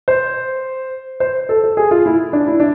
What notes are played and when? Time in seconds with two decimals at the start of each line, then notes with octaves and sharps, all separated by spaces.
0.08 C5
1.20 C5
1.49 A4
1.64 A4
1.77 G#4
1.91 F4
2.06 E4
2.33 D4
2.46 E4
2.60 D4